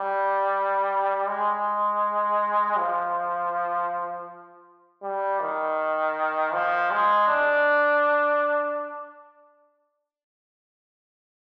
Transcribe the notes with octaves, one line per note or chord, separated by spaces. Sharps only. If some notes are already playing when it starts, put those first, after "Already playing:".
Already playing: G3
G#3
F3
G3
D#3
F3
G#3
D4